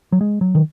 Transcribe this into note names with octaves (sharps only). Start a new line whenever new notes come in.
F#3
G#3
F#3
D#3